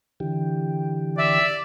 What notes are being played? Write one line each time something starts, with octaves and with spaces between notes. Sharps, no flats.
D3 E3 G4
D5 E5